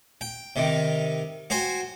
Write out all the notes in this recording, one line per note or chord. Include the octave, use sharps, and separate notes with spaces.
G5
C3 D#3
F#4 C5 G5 G#5